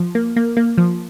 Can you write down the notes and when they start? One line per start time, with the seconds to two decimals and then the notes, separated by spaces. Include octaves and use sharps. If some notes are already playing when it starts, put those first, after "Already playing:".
Already playing: F3
0.15 A#3
0.36 A#3
0.57 A#3
0.78 F3